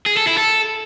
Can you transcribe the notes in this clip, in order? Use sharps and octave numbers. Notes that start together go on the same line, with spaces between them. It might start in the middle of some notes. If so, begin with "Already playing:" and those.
G#4
A4
E4
A4